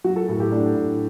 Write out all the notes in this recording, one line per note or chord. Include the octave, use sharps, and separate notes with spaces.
F#3 F#4
A4
A2 A4
G4
A3 D4
A2